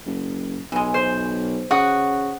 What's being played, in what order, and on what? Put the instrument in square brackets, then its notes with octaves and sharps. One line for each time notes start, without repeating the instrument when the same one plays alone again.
[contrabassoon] F#1
[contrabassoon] B1 [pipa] E3 G#3
[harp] C5
[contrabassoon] C#3 [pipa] F#4 [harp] F#5 D#6